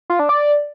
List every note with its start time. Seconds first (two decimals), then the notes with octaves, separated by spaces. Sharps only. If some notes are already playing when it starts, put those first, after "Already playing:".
0.10 F4
0.19 D4
0.29 D5